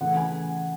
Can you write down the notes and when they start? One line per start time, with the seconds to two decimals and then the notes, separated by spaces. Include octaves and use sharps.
0.01 C#3 E3 A3 F#5
0.17 G#5